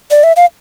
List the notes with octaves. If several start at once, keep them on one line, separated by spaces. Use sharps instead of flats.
D5
E5
F5